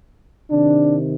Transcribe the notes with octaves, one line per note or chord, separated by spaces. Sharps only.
C3 D#3 D4